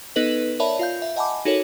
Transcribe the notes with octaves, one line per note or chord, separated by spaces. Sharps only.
B3 D#4 A4 B4 D#5 F#7
A#4 C#5 D5 E5 A5 B5
F4 F5 G6
E5
D#5 F#5 G#5 A5 B5 D6
D#4 F#4 A4 A#4 C#5